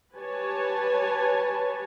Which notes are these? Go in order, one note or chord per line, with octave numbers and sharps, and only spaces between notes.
G4 B4 C#5 G#5 A5